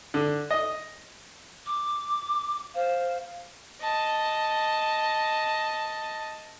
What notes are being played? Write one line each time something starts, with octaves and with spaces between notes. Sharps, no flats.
D3
D#5
D6
C5 F5
D#5 A5